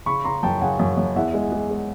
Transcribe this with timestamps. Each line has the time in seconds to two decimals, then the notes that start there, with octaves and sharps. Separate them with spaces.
0.06 C#3 B5 C#6
0.25 C#3 A#5 C6
0.43 F#2 G5 A5
0.61 C#3 F#5 G#5
0.79 F#2
0.97 F#2
1.16 E2 E5 F#5
1.34 G#3
1.52 G#3
1.70 G#3